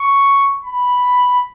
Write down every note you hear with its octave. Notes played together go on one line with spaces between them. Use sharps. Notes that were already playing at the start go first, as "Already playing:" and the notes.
Already playing: C#6
B5